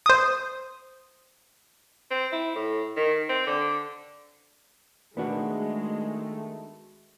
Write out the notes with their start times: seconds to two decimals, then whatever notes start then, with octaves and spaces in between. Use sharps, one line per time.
0.06 C5 D#6
2.11 C4
2.32 E4
2.55 A2
2.96 D#3
3.29 C4
3.47 D3
5.17 D#3 G#3 A3 B3 D4 F#4